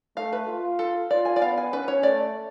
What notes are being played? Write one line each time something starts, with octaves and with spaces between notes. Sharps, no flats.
A3 F5
B4
F4
A4
F4 D5
G#5
D5
B3 F5
G#5
C#4 B4
C#5
A3 D5